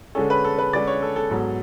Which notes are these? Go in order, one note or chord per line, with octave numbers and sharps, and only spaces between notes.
D3 G#3 C#4 A4
B4
A4
B4
D3 G#3 C#4 D5
C#5
A4
A4
G#2 F#3 B3